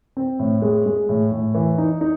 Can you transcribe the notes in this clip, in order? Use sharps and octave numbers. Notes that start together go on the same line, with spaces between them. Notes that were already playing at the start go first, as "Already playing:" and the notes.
C4
A2
G#3
G#3
A2
A2
E3
D#4
D#4